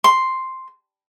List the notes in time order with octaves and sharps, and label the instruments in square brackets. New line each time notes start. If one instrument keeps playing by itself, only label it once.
[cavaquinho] C6